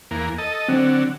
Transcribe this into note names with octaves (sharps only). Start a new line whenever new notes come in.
E2 A#3
A4 D#5
D3 F#3 C4